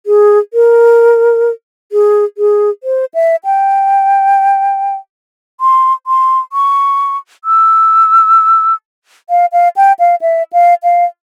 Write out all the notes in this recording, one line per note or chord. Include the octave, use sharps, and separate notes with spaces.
G#4
A#4
G#4
G#4
C5
E5
G5
C6
C6
C#6
E6
F5
F5
G5
F5
E5
F5
F5